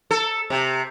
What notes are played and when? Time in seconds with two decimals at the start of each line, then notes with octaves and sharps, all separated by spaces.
0.11 A4
0.50 C3